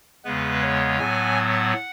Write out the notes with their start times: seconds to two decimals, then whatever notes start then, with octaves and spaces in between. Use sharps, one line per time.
0.24 E2 C#3 G#3 B3 B4
0.61 C#5
0.99 A2 F#3 B3 G#5
1.36 F#5